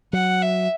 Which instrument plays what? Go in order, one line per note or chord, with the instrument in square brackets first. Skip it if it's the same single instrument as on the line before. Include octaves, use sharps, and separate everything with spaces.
[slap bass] F#3 [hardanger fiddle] F#5
[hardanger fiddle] E5